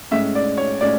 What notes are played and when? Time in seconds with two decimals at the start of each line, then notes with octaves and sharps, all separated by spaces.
0.11 A2 G#3 C#4 E5
0.35 D5
0.57 C#5
0.81 A2 G#3 C#4 D5